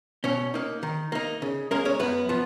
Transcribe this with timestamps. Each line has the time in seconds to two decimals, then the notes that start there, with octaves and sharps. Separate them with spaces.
0.24 B2 C#4 C#5
0.54 A#3 D#4
0.83 D#3
1.12 A#3 D#4
1.42 C#3
1.71 G#3 A#3 C#4 A#4
1.85 C#4 C#5
1.99 F#2 B3 B4
2.29 F3 B3